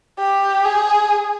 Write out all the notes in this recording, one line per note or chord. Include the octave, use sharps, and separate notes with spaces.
G4
G#4